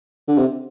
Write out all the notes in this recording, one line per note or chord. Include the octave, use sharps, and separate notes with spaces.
D3
C3